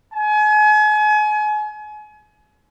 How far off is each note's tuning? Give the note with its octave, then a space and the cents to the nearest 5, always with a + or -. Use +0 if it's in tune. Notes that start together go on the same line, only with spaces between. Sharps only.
G#5 +35